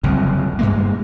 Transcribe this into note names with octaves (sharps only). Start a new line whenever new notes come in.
F#1 C2 F2
G2 G#3 A#3